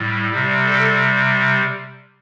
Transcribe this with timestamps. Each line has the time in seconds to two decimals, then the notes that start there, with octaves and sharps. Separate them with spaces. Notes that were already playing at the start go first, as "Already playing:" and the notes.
Already playing: A2 G3
0.30 C3 G3
0.64 A4